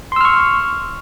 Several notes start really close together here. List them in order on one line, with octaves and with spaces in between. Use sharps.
C6 E6 F6 C#6